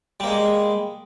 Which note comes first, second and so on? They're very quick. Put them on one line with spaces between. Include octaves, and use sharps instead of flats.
G3 A#3 G#3